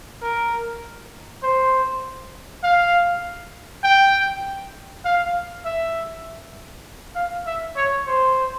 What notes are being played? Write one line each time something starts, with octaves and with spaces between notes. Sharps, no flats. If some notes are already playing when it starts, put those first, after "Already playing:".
A#4
C5
F5
G5
F5
E5
F5
E5
C#5
C5